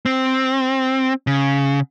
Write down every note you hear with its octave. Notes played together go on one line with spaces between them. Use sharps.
C4
C#3